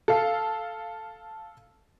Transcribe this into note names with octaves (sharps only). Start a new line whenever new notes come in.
A4 F5